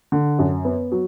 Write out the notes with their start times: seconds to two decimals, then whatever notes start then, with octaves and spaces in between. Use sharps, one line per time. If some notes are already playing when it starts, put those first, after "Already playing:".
0.12 D3
0.39 F#2
0.65 B3
0.92 F#3